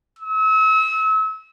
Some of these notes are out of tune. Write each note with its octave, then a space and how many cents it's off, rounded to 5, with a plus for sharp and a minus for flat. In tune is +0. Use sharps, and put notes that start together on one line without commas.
E6 -35